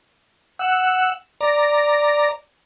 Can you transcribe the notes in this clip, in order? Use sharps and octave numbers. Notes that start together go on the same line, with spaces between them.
F#5 E6
D5 A#5